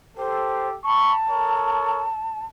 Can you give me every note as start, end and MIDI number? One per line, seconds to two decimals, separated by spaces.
0.17 0.75 67
0.17 0.75 69
0.17 0.68 72
0.85 2.45 81
0.85 1.14 83
0.85 1.14 85
1.29 2.07 69
1.29 2.07 70
1.29 2.07 73